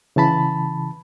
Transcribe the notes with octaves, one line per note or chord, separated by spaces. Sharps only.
C#3 E3 A5 B5